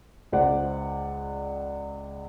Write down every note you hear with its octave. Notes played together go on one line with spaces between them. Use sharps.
C#2 C5 D5 F#5